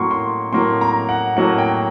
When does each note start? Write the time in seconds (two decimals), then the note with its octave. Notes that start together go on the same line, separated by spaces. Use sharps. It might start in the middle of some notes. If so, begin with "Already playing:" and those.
Already playing: A2 F#3 A#3 C6 C#6
0.11 C6
0.53 A2 F#3 A#3 C6
0.81 A#5
1.09 F#5
1.37 A2 F#3 A#3 F#5
1.58 G5